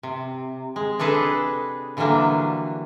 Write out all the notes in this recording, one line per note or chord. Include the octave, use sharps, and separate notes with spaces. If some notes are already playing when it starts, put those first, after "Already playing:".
C3
G#3
C3 D4 G#4 A4 B4 D#5
D3 E3 F#3 G3 A#3 D4